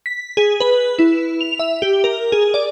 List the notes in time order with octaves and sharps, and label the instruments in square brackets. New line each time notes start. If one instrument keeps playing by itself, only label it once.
[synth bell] B6
G#4
B4
E4
F7
E5
G4
A#4
G#4
D5